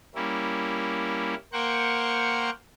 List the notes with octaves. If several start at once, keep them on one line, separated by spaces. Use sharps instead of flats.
G3 A#3 C#4 E4
A#3 A#4 C5 F#5 G5 C#6